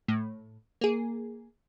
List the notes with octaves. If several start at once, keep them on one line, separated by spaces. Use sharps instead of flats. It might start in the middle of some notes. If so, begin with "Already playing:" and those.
A2
A#3 G#4